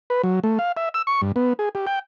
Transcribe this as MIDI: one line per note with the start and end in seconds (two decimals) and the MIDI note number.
0.10 0.22 71
0.23 0.40 54
0.44 0.59 57
0.59 0.72 77
0.77 0.89 76
0.94 1.02 88
1.07 1.21 85
1.22 1.32 43
1.36 1.53 59
1.59 1.69 68
1.75 1.86 67
1.87 1.99 79